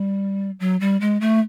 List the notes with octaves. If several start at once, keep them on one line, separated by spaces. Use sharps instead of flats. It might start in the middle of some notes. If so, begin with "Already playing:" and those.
Already playing: G3
F#3
G3
G#3
A3